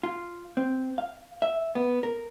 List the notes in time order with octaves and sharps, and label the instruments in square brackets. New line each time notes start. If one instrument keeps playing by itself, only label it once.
[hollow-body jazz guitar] F4
C4
F5
E5
B3
A#4